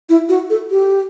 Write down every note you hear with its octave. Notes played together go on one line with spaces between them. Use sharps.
E4
F#4
A4
G4